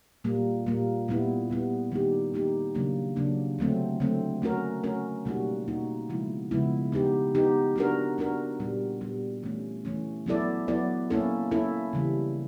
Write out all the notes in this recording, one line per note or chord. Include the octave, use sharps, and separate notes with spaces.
A#2 G3 A#3
A#2 G3 A#3
A#2 G3 B3 E4
A#2 G3 B3 E4
D#3 G3 A#3 D#4 G4
D#3 G3 A#3 D#4 G4
C#3 F#3 A#3 D4
C#3 F#3 A#3 D4
D3 F#3 A3 C4
D3 F#3 A3 C4
A3 C#4 F#4 A#4
A3 C#4 F#4 A#4
B2 G3 A#3 D#4 F#4
B2 G3 A#3 D#4 F#4
C#3 F3 G#3 B3 E4
C#3 F3 G#3 B3 E4
B3 D#4 G4
B3 D#4 G4
B3 D4 F#4 A#4
B3 D4 F#4 A#4
A#2 G3 B3
A#2 G3 B3
E3 A3 C#4
E3 A3 C#4
F#3 B3 E4 A4 D5
F#3 B3 E4 A4 D5
A#3 C#4 E4 A4
A#3 C#4 E4 A4
C#3 E3 G3